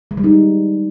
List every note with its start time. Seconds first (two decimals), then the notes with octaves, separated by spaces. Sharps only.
0.11 G#3
0.17 G3
0.24 D#4